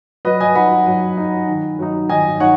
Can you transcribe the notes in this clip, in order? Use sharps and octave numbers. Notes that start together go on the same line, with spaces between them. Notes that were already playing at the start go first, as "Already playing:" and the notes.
F#3 B4 D#5
D#5 G#5
D#4 F#5 B5
F#3
D#4
D#3
F#3 D#4
D#3 D#5 G#5
D#4 C#5 F#5